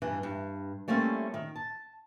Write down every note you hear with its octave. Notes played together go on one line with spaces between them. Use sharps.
G2 E3
G2
G3 A3 A#3 C4 C#4 E4
D#3
A5